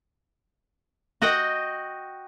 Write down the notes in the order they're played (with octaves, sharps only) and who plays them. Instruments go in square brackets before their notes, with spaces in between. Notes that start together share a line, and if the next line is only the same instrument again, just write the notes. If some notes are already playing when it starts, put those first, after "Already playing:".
[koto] F#4 D#5 F#5 G5